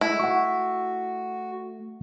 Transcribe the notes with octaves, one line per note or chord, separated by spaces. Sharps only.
G#3 A3 E4
F#4 F#5 C#6